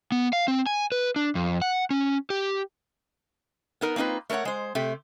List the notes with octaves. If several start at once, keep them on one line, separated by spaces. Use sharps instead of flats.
B3
F5
C4
G#5
B4
D4
F2
F#5
C#4
G4
B3 D#4 A#4
A#3 C4 D#4 F4 B4
A3 A#4 B4 C#5 F#5
G#3 C5
C3 A3 G4